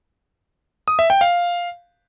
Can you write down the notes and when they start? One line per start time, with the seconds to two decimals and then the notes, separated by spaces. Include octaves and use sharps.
0.88 D#6
0.99 E5
1.10 G5
1.21 F5